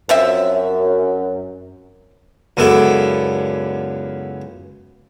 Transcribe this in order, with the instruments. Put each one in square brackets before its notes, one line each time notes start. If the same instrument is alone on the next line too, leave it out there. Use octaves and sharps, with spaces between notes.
[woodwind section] F#2 [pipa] F3 C4 E5
[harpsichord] C#2 F#2 B3 E4 A4 D5